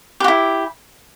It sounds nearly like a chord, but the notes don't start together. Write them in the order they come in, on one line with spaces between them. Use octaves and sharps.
G4 F#4 E4